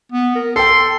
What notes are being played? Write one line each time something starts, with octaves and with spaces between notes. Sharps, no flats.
B3
A#4
A4 G5 C6